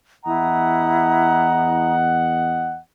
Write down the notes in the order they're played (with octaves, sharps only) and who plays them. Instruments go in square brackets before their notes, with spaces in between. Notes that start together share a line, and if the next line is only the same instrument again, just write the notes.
[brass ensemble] E2 D#5 F#5 [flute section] E4 A#5 D#6